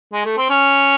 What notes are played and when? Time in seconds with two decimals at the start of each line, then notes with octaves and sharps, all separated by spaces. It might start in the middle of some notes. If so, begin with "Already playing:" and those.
0.13 G#3
0.25 A3
0.38 C4
0.50 C#4